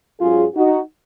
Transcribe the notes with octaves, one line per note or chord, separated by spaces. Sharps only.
G#2 F#3 C#4 F4 G#4
D#4 F#4